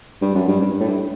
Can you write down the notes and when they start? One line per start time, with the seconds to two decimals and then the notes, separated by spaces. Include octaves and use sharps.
0.21 G2
0.35 F#2
0.48 G2
0.61 G2
0.80 A2
0.88 G2